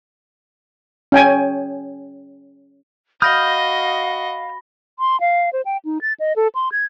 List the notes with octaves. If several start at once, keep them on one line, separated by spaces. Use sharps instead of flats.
C#4 G5 G#5
F#4 D#5 F5 B5 D#6 F6 G6 A#6
C6
F5
C5
G5
D#4
A6
D#5
A4
C6
G#6